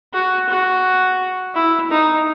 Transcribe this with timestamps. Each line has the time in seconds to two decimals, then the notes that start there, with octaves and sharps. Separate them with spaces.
0.14 F#4
0.49 F#4
1.55 E4
1.91 D#4